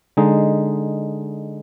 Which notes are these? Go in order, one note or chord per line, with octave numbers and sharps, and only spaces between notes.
D3 G#3 D#4